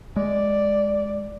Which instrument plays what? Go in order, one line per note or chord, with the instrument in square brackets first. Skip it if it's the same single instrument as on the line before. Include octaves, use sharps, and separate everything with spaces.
[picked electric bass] G#3 [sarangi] D5